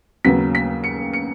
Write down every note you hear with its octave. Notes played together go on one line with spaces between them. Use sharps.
D#2 C#3 F#3 B3 B6
B6
C#7
C#7